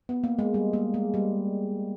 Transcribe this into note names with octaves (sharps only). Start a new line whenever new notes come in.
B3
A#3
G#3
G3
A#3
G#3
G3